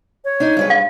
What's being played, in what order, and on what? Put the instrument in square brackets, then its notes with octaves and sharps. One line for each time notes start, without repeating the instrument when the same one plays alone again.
[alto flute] C#5
[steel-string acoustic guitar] D4 D#4
G2 G#3 B4
[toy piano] F5